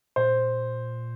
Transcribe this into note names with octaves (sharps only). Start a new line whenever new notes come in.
A#2 C5